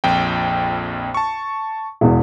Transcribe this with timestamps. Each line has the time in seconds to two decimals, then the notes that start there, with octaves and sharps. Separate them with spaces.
0.04 A#1 F2 G5
1.14 A5 C#6
2.01 E1 E2